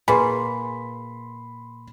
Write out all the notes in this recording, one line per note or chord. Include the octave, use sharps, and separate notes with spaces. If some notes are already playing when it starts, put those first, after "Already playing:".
A#2 G#4 B4 G#5 B5 C6